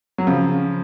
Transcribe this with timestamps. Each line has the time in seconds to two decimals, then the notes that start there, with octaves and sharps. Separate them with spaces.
0.18 F#3
0.27 C#3 F3